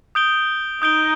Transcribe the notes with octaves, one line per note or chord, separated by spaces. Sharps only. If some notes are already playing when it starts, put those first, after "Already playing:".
D#6 G6 D7 G7
D#4 D#6 G6 D7 G7